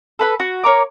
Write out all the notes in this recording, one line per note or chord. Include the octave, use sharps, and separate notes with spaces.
A4 B4 B5
F#4
A#3 C#5 A#5 D6